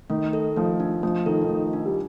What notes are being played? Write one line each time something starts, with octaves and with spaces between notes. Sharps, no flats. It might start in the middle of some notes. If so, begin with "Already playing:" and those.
D#3 A3
A4
F3 A3
D4
F3 A3
D#3 A4
D#3 A3
D4
G3